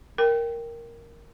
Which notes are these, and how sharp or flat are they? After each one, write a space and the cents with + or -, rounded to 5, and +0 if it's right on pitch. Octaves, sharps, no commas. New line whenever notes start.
A#4 +0 G5 +0